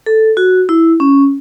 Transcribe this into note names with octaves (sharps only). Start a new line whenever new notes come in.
A4
F#4
E4
C#4